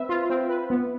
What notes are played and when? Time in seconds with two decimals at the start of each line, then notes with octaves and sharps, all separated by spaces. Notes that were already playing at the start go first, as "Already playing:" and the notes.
Already playing: C4 B4 E5
0.09 F4
0.30 C4
0.49 B4
0.70 B3